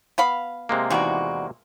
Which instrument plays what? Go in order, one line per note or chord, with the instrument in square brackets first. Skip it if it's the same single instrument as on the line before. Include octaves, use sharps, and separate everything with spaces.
[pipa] B3 F5 B5
[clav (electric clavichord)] C3 G#3 A#3
[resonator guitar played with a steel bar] E2 F#4 D5 [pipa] D#3 E3